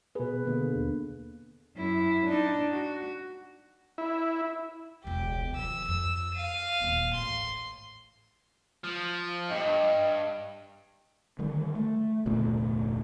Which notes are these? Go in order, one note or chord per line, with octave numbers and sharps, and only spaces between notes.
B2 G#4 B4
D3 A#3 B3
D#2
F#2 E4
D4 D#4
F#4
E4
E1 C#2 G4
D#3 F3 E6
F2
F5 D#7
D#1 C4
A1 C6
F3
G2 D#5
D3 D#3 G3
A3
F1 D2 A#2 A3